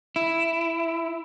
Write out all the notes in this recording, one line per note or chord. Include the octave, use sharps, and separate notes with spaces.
E4